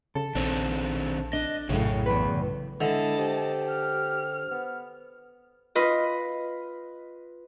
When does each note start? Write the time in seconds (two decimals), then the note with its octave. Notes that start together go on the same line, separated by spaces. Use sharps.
0.15 C#3 A4
0.35 A#1 D#3 C4 D4
1.33 D4 D#5
1.69 A#1 F#2 A2 C#3
2.06 E2 B4
2.81 D3 G#3 D4 E4 D#5 A5
3.18 G4 C5
3.69 F6
4.51 B3
5.75 F4 B4 D#5